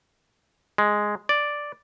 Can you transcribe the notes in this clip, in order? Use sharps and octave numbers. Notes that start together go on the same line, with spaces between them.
G#3
D5